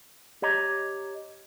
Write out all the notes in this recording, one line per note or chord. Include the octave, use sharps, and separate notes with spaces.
G4 C#5 D#5 A#5